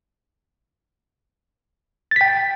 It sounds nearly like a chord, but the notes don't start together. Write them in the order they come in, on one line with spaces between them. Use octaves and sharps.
A6 B6 G5